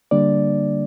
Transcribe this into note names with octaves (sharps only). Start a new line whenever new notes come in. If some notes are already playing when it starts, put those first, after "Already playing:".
D3 G3 A#3 D4 D5